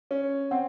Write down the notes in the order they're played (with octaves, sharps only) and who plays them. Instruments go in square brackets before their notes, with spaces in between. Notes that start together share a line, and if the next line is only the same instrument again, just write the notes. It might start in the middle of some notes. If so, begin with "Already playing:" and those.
[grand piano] C#4 [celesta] C#5
[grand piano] C4 [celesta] F#5